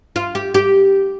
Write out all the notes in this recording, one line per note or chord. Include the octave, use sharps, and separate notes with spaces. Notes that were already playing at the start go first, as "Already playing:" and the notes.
F4
G4
G4